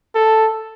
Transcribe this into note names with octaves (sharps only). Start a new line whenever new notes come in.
A4